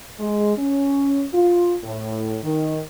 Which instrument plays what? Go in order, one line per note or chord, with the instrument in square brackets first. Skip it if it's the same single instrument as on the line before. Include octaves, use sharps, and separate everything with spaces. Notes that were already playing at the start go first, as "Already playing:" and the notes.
[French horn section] G#3
C#4
F4
A2
D#3